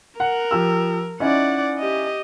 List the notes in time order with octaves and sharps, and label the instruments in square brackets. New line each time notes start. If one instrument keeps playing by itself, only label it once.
[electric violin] A#4 [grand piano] F#5
[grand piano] F3 G4 E6
[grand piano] C#4 D#4 E4 [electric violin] D5 F#5
[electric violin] G4 D#5